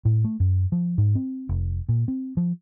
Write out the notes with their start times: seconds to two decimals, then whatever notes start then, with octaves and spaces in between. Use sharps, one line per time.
0.05 A2
0.24 A3
0.40 F#2
0.72 F3
0.98 G#2
1.15 C4
1.49 F1
1.89 A#2
2.08 C4
2.37 F3